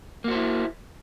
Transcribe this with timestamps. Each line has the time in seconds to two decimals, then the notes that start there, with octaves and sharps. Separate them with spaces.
0.24 A#3
0.28 F#4
0.31 C5
0.35 E4